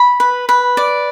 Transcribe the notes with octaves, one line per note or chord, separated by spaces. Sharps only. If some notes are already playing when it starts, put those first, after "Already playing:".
Already playing: B5
B4
B4
D5